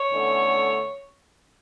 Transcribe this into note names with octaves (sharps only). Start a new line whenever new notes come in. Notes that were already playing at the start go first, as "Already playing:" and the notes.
Already playing: C#5
E2 D3 A3 C#4